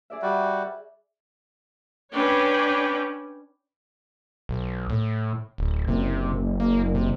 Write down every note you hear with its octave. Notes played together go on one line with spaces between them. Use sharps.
G#4 D5 E5
G3 F#4
C#4 D4 B4 C#5 G5
B1
A2
D1
F#1 C3
A#3
C3